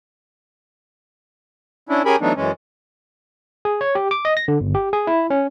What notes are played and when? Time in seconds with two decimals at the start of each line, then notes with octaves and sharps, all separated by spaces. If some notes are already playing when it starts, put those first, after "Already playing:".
1.89 C#4 D4 E4
2.06 C#4 G4 G#4 A#4 G#5 B5
2.21 E3 F#3 A3 B3 D4 D#4
2.36 F#2 E3 G#3 C#4
3.65 G#4
3.81 C#5
3.95 G4
4.11 D6
4.25 D#5
4.37 A#6
4.48 D3
4.61 G1
4.75 G4
4.93 G#4
5.07 E4
5.30 C#4